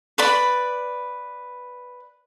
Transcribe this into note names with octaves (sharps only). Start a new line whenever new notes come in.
B4 D5 B5